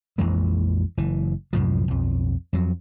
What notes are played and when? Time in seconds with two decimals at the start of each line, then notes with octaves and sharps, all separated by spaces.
0.18 A#1 F2 E3 G#3
0.97 F#1 E3
1.53 C2 F#2 A2 F3
1.88 B1 F2
2.53 F2 F#3